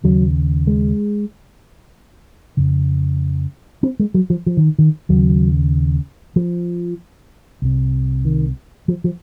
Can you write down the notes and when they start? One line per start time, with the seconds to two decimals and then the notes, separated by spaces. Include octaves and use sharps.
0.04 D#2 C#3 F#3
0.67 G#3
2.57 F2 C#3
3.83 C4
3.99 G#3
4.14 F#3
4.30 F3
4.46 F3
4.57 D#3
4.79 D#3
5.09 D#2 C#3 F#3
6.36 F3
7.62 C2 C3
8.25 D#3
8.88 F3
9.04 F3